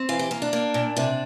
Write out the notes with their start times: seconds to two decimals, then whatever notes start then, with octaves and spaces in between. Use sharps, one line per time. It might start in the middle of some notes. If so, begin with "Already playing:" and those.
Already playing: C4
0.09 E3 F5
0.19 G4
0.31 A#3
0.42 D4
0.53 A#3
0.74 A#2
0.96 C3 D4